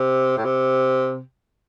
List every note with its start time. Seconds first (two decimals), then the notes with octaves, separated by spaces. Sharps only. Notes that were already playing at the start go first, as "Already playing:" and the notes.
Already playing: C3
0.37 A2
0.44 C3